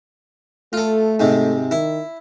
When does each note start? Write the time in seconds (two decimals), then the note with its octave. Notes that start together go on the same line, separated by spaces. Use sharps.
0.73 A3 F4 A4
1.20 G#2 C3
1.71 D#3 E4